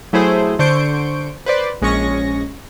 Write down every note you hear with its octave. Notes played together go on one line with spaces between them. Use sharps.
F#3 A3 E4 G#4 C5
D3 C5 C#6 G6 D7
B4 C5 D5
A#1 G#3 C#4 C#6 A#6